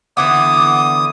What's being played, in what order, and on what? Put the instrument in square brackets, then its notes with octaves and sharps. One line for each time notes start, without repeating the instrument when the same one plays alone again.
[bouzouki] D3 E3 B3 [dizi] D6 [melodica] D#6